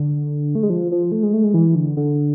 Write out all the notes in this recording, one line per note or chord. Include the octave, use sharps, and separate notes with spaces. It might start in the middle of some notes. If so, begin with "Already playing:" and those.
Already playing: D3
A3
G#3
F3
F3
A3
G#3
A3
G#3
E3
D3
D3